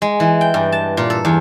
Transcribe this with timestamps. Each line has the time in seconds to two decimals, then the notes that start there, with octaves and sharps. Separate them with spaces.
0.02 G#3
0.20 E3
0.41 G5
0.54 G2
0.72 A5
0.97 A#2
1.10 A4
1.25 E2